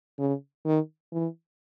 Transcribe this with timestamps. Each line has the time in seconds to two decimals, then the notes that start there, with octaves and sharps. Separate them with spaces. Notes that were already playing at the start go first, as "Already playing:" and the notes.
0.19 C#3
0.65 D#3
1.12 E3